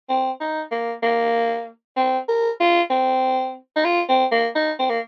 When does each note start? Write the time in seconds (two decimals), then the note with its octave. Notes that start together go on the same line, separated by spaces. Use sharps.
0.09 C4
0.40 D#4
0.71 A#3
1.03 A#3
1.97 C4
2.29 A#4
2.60 F4
2.90 C4
3.76 D#4
3.85 F4
4.09 C4
4.31 A#3
4.55 D#4
4.79 C4
4.89 A#3